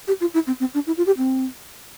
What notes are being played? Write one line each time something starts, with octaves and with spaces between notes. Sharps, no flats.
G4
F4
E4
C4
C4
D4
E4
F4
G4
C4